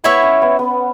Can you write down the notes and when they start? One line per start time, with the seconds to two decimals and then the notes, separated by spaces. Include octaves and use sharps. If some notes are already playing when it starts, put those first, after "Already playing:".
0.04 B3 E4 C#5 E5
0.23 C#4
0.42 B3
0.59 B3